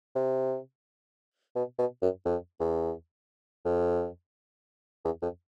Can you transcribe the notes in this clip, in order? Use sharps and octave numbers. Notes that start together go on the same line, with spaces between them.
C3
B2
B2
F#2
F2
E2
F2
E2
F2